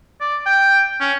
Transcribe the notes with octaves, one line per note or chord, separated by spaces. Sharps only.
D5
G5
C#4